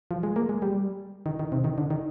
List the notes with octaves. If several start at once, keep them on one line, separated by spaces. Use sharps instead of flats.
F3
G#3
A#3
G#3
G3
D#3
D#3
C3
D#3
D3
D#3